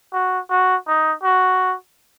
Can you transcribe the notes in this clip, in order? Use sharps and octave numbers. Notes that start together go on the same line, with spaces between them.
F#4
F#4
D#4
F#4